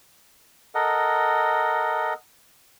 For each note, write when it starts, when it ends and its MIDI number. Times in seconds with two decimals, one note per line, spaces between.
0.75 2.14 69
0.75 2.14 70
0.75 2.14 75
0.75 2.14 78